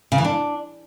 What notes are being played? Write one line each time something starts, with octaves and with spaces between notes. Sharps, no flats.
C#3
E3
D4